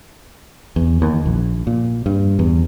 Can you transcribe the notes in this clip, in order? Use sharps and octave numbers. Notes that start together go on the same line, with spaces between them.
E2
D#2
A#1
A#2
G2
E2